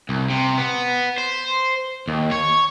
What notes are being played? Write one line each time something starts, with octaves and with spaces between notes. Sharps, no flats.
C2
C3
B3
C5
D#2
C#5